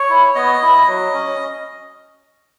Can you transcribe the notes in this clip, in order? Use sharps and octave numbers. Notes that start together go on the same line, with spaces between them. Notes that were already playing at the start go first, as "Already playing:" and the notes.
Already playing: C#5
E4
B3 D#5
E4
F#3
C#4